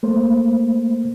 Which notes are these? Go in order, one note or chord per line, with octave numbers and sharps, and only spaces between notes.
A3 A#3 C5